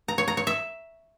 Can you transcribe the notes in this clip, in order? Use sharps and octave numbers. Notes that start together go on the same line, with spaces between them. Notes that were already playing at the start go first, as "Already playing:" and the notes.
A#5
C#5
A#5
C#5
E5